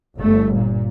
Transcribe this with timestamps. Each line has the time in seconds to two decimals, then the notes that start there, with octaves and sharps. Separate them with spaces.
0.18 G1 A3
0.53 A#2